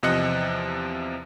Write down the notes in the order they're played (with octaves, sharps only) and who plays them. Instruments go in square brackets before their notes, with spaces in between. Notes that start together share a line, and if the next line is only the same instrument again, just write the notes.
[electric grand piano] E2 C3 F3 D#5 F#6 C#7